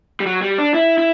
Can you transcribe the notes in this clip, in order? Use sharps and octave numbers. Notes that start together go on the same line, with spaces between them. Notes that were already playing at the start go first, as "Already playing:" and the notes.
G3
F#3
G3
D4
E4
E4